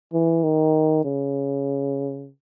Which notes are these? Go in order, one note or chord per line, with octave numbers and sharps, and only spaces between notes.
E3
D#3
C#3